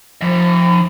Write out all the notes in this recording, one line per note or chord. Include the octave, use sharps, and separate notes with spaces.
F3 E5